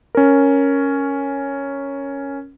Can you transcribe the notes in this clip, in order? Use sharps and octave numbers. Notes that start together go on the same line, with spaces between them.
C#4 A#4